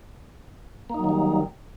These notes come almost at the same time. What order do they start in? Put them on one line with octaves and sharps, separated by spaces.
A#3 D#4 F#3 D#3 G3